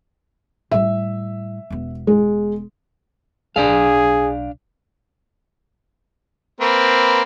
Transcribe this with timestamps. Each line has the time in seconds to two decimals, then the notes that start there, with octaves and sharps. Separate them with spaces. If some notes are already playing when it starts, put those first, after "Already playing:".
0.71 A2 G3 E5
1.70 E1 B3
2.07 G#3
3.56 B1 D4 G#4 D5 F5
6.61 A#3 C4 B4